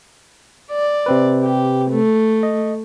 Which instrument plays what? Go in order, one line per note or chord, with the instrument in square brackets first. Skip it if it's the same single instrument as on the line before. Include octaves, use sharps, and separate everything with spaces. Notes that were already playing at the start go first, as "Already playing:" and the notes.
[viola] D5
[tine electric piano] C3 C4 B4
[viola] G4
A3
[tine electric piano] D#5